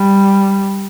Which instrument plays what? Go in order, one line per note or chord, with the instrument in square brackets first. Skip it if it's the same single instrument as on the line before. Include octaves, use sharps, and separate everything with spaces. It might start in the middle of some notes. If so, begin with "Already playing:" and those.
Already playing: [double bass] G3